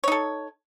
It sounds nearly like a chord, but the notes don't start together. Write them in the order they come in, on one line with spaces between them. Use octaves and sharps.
C#5 D#4 A4